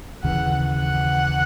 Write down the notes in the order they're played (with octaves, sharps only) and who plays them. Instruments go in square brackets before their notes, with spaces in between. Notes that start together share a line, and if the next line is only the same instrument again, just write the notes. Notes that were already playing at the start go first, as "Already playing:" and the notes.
[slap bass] D#2 C#3 E3 [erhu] F#5
[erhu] F#5